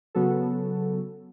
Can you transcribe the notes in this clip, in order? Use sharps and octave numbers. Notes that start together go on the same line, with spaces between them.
C#3 F#3 B3 F#4 A4